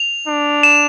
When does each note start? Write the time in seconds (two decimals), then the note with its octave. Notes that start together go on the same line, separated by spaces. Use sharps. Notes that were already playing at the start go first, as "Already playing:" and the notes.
Already playing: F7
0.28 D4
0.63 E7